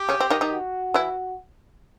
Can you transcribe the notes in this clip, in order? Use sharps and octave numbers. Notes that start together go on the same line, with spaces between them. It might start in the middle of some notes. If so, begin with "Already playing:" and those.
Already playing: G4
C#3 C#4
C4
D#3 D#4
D#3 D#4
F#4
E3 E4